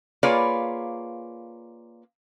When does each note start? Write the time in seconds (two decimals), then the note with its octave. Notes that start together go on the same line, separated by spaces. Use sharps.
0.23 A#3 F4 G#4 B4 C#5 D5